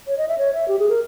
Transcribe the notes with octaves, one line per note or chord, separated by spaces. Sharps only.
C#5
D#5
E5
C#5
E5
G4
G#4
A#4